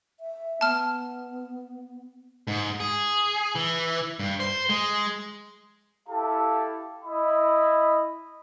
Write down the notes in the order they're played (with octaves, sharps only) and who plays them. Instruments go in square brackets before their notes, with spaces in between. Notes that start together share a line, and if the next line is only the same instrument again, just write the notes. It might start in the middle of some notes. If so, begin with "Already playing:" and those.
[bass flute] E5
[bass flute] B3 [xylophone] A5 F6
[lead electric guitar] G#2
G#4
E3
G2
C5
G#3
[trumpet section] E4 G4 A4 F5 A5
E4 D#5 B5